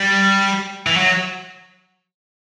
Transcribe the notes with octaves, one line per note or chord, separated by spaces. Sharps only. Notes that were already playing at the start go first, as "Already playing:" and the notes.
Already playing: G3
E3
F#3